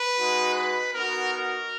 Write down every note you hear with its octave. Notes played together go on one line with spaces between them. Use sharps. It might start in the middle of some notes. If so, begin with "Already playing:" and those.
Already playing: B4
G#3 D#4 F#4
B4
B3 D#4 F#4 A#4
A#4